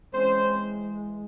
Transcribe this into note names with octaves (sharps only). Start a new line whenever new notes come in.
E3 G#3 C4 C#4 C5